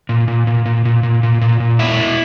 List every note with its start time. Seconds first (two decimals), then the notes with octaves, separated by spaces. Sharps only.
0.09 A#2
0.28 A#2
0.47 A#2
0.66 A#2
0.85 A#2
1.03 A#2
1.23 A#2
1.41 A#2
1.60 A#2
1.79 B2 E4
1.99 B2